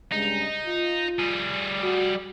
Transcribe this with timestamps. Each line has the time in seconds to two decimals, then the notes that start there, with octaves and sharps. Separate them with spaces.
0.12 G2 C#3 G#3 D#4
0.66 F4
1.19 G3 G#4
1.82 F#4